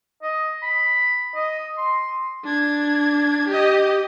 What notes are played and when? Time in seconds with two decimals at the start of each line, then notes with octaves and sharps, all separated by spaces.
0.22 D#5
0.62 B5
1.35 D#5
1.77 C6
2.44 D4 G#6
3.48 G4 D#5